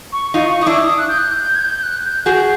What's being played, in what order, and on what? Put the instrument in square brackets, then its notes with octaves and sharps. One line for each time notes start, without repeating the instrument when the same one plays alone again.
[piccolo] C#6
[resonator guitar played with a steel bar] D#4 F4 [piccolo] C#6
[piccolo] C#6
[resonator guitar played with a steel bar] D#4 [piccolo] D#6
[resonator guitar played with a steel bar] D4 E4 [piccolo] D6
[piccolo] D#6
F#6
G6
F#6
G6
G#6
G6
G6
F#6
G6
[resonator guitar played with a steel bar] F#4 G#4 [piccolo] G6